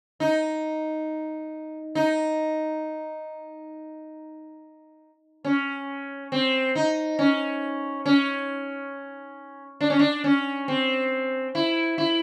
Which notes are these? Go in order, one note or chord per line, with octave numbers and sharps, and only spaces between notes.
D#4
D#4
C#4
C4
D#4
C#4
C#4
D4
C#4
D4
C#4
C4
E4
E4